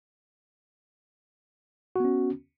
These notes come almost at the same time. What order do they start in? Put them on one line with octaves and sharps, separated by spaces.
F#4 B3 C#4